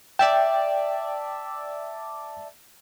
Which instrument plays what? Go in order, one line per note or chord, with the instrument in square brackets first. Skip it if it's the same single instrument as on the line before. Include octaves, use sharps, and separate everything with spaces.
[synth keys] D5 E5 A5 [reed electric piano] G5